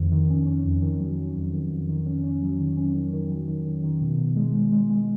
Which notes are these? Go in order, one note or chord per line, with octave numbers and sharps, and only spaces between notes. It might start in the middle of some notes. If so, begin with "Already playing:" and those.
Already playing: F2 D#3
D#3
C#4
C#4
F2
D#3
F#3
F#3
F2
D#3
F2
D#3
C#4
C#4
F#3
D#3
C#4
D#3
D#3
F#3
D#3
D#3
D#3
B2
B2
G#3
G#3
G#3
G#3